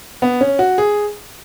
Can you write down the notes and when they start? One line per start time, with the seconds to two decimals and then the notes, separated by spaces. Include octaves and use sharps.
0.22 B3
0.41 C#4
0.59 F#4
0.78 G#4